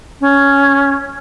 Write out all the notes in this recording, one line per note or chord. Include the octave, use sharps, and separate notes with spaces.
C#4